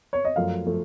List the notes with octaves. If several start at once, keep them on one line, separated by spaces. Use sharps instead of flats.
C#5
D#5
F#2 F3 A3 F5
F3 A3